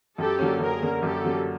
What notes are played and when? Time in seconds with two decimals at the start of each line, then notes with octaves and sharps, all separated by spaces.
0.18 F#2 G4 A4
0.39 D3 F#3 A#3 C#4
0.60 F#2 G#4 A#4
0.82 D3 F#3 A#3 C#4
1.03 F#2 G4 A4
1.25 D3 F#3 A#3 C#4